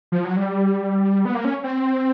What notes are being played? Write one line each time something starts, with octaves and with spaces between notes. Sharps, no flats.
F3
F#3
G3
B3
A#3
C#4
C4